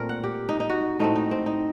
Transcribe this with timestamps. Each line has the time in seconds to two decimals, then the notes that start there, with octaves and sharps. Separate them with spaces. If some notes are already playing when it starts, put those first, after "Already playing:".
Already playing: A#2 A3 C4 A#4
0.09 F#5
0.24 G4
0.49 D#4
0.60 D#4
0.70 F#4
0.99 A2 A3 C4 D#4
1.16 D#4
1.31 C4
1.46 D#4